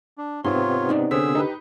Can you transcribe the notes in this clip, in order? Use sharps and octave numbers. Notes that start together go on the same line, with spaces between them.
D4
G#2 C3 B3 C4 F4 C#5 C6
C#4 D#4 D5
D3 C#4 G#4 C5 E6 B6
D#4 G4 B4